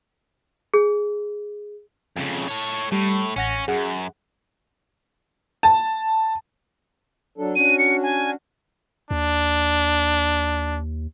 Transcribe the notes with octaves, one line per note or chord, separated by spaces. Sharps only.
G#4
F2 C#3
A4 C#5
A2 G3
A1 C#4 F#5 A#6
F#2 G#4 F#5
A5
F#3 D4 A4
C#4 D4 F#4 D#7
C#7
G#5
D#2 D4